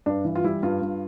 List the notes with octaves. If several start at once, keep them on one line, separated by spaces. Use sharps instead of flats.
G2 D4
E3
F4
G3 E4
G2 F4
G2